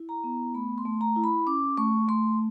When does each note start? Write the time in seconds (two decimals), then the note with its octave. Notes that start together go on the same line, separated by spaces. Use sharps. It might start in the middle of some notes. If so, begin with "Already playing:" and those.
Already playing: E4
0.09 A#5
0.24 B3
0.54 A3 B5
0.78 C6
0.86 A3
1.01 A#5
1.16 E4
1.24 B5
1.47 C#4 D6
1.77 A3 C#6
2.08 A3 C6